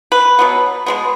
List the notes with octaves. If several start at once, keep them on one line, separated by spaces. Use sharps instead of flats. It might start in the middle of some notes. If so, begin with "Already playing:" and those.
B4
B2 F#3 B3
B2 G#3 B3